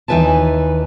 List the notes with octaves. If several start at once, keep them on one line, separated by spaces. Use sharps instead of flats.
D#2 E3 D#4 B4 G#5 A5